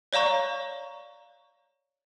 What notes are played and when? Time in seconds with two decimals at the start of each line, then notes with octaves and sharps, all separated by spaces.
0.13 C#5 D5 F5 A#5 C#6